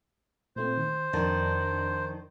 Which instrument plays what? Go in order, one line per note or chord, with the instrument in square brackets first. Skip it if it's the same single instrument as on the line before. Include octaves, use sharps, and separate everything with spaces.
[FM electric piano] A#2 A3 C4 [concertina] C5
[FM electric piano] D#3
[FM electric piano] F2 D4 A5 [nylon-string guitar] D#3